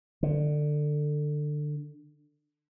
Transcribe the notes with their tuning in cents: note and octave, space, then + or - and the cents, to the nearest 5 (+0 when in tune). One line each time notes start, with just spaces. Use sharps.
D3 +20